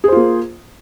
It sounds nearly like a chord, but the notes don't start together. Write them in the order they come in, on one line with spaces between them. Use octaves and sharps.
G#4 C5 F4 A#3